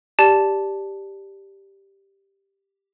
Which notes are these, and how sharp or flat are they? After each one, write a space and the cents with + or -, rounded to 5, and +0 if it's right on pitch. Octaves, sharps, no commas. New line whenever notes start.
G4 +0 D5 +0 A5 +0